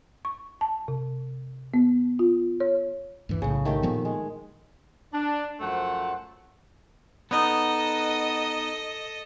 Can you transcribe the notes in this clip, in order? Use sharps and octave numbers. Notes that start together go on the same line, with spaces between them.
C#6
A5
C3
B3
F4
C#5
D2 G2 E3
B1 A2 C#3
D#3 A3 G4
A#2 F3 B3
G#3
D4
F#2 F3 A3 C5 F#5
B3 D#4 A4 D#5